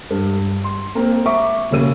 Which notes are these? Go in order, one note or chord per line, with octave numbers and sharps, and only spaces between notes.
G2
C6
A#3 C4 A#4
E5 C#6 D6
E1 D#2 C#3 E6 D#7